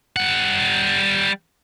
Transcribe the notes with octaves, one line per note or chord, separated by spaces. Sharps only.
G3 F#5